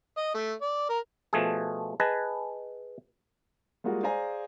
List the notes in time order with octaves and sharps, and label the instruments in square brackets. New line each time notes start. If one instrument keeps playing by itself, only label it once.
[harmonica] D#5
A3
D5
A#4
[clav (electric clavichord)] B2 F3 A3 G#4
G#4 B4 D#5 A5
[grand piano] G3 G#3 A#3 F4 F#4 G#4
G#4 C5 D5 F5 G#5 A#5